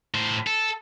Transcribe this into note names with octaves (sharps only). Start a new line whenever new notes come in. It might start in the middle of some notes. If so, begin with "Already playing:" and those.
A2 C5
A4